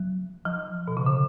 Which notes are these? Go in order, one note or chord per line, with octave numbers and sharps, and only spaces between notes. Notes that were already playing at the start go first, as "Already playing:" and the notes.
Already playing: F#3
F3
B2
C#3
D3